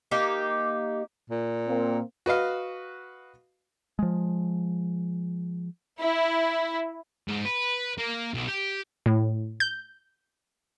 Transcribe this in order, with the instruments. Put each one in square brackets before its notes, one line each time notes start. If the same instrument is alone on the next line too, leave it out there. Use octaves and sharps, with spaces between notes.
[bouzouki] A#3 D#4 G4
[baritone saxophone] A#2
[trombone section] A#3 C4
[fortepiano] F#4 B4 D#5 F5
[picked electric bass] F3 G#3
[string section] E4
[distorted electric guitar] G#2
B4
A#3
B1
G4
[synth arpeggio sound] A2
G6